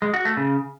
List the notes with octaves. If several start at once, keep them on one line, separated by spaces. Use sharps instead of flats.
G#3
F#4
A3
C#3